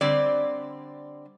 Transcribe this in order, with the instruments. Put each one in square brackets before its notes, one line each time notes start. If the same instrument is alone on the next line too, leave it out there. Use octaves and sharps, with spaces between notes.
[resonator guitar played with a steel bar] D3 G3 C4 D5